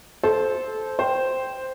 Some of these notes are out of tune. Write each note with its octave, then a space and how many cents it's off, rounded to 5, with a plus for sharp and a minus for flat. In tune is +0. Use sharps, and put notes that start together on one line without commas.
A4 -20 C5 +0
C5 +0 G5 +0